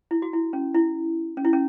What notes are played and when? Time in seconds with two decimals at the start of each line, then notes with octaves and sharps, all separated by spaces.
0.11 E4
0.22 F#4
0.33 E4
0.53 C#4
0.75 E4
1.37 C#4
1.45 E4
1.53 C#4